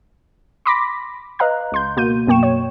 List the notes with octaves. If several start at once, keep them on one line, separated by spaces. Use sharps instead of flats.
B5 C6 D6 A#6 B6
B4 D#5 F5 A#5 F#6
C#2 C6 G6
B2 A#3 F#4 G6 D#7
F#2 B2 A#3 G5 C#6 E7
C#5